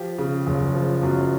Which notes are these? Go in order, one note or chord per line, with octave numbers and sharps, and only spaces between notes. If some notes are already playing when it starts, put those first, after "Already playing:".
Already playing: F3 G4
C#3
F#1
F3
F#2